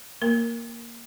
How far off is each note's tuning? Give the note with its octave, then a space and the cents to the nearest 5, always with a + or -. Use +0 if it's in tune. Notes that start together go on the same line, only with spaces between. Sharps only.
A#3 +0 A#4 +0